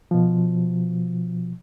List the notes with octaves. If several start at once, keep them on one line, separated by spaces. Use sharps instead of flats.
B2 F3